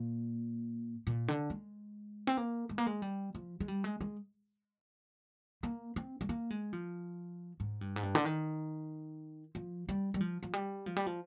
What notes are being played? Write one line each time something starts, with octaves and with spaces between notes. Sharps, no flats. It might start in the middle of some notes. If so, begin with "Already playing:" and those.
Already playing: A#2
A#2
D3
G#3
C4
A#3
G#3
A#3
G#3
G3
F3
G#3
G3
G#3
G#3
A#3
C4
G#3
A#3
G#3
F3
G#2
G2
G#2
G2
D3
D#3
F3
G3
G3
F3
F3
G3
F3
G3
F3